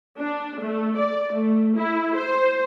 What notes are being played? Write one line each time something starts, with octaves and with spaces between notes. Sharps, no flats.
D4
A3
D5
A3
E4
C5